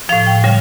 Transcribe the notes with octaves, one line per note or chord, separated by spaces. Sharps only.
A2 F3 F5
G5
C#3 G3